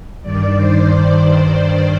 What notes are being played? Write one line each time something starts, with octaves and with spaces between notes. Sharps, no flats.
G2 D#3 D5
C5